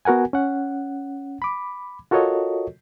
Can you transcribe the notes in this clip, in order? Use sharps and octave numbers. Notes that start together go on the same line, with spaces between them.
B3 F#4 A#4 F#5 G#5
C#4 F#5
B5 D6
F4 F#4 A4 A#4 C#5 D#5